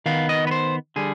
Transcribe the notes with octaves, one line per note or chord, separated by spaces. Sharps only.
D#3 B3 F5
D#5
B4
C5
D3 G3 G#4